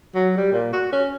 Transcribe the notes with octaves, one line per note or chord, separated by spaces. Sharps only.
F#3
G3
A#2
F#4
C#4